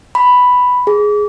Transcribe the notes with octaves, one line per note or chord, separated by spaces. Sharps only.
B5
G#4